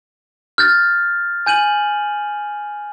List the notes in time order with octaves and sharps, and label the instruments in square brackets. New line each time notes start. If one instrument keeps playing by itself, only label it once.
[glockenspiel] F6 G6 A6
G#5 G6 D#7 F#7